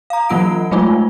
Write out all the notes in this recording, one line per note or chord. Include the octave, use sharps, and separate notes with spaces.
F5 A#5
E3 F#3 A#3 F4 F#5 D7
F#3 G#3 A3 D#4 F4